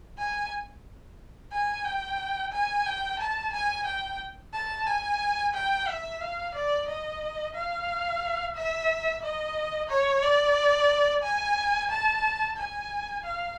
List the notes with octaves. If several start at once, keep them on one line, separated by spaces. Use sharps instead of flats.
G#5
G#5
G5
G#5
G5
A5
G#5
G5
A5
G#5
G5
E5
F5
D5
D#5
F5
E5
D#5
C#5
D5
G#5
A5
G#5
F5